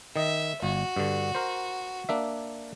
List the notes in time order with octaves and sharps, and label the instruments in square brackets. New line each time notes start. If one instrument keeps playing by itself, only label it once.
[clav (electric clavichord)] D#3 D#5 [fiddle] E5
[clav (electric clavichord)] G1 [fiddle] F#4
[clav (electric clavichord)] G2 D3
A#4 C5
A#3 D4 E5